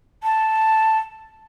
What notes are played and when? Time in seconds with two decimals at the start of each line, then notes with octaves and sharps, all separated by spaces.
0.23 A5